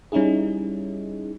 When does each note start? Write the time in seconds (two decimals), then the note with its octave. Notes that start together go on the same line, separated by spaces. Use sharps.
0.12 G3 C#4 D#4 E4 G#4